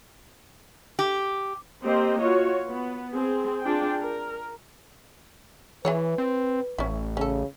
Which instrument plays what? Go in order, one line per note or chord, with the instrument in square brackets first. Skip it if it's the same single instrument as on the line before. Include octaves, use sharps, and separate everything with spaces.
[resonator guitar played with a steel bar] G4
[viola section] A#3 C4 G4 C5 D#5
F4 F#4 C#5
B3
C4 G#4
D4 F4 G#4 G5
A#4
[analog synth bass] E3 [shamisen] E4 G#4 C#5 [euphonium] B4
[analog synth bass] C4
[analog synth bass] A1 [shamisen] C#4 E4
[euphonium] C#3 [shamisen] C#4 A4